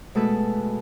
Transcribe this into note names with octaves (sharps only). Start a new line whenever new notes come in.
B2 G#3 A3 A4 B4